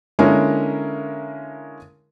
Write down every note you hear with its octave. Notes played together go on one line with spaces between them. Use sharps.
D3 G#3 A#3 C#4 E4 A#4